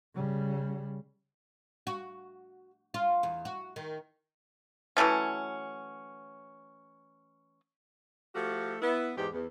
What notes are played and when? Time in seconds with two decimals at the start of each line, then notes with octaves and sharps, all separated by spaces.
0.15 C#3 G3
1.87 F#4
2.94 F4
3.23 E2
3.45 F#4
3.76 D#3
4.97 E3 F#3 A3 C#4
8.35 F3 A3 F#4 G4 A4 F5
8.82 B3 E4 B4
9.17 E2 G#2 G4
9.33 E2